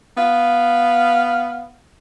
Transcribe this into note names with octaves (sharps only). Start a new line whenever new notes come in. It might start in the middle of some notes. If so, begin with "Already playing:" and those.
B3 F5